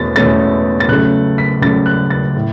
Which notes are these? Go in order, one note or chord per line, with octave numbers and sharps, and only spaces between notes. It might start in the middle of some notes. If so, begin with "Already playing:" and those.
Already playing: E2 B2 A3 C#4 A6
E2 B2 A3 C#4 A6
A6
C#2 C#3 F#3 A3 F#6
B6
C#2 C#3 F#3 A3 A6
F#6
A6
A2